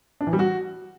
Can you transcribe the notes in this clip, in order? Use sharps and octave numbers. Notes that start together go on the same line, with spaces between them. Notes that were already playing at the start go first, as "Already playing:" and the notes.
D4
E3
G3
F#4